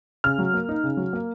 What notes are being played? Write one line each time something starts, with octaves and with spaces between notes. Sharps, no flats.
C#3 F6
F#3
A#3
D#4
C#3
F#3
A#3